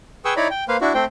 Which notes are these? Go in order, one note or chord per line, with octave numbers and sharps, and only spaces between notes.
G#4 B4 G5 C#6 D#6 E6
D#4 E4 C#5 D5 A#5 B5
G5
A#3 B4 C5 F5
D4 E4 F#4
A3 C4 C5 G5